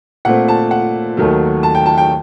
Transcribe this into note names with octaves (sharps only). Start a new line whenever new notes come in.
A#2 A3 C4 F#5
A5
F#5
D#2 D#3 F#3 A3
A5
G5
A5
G5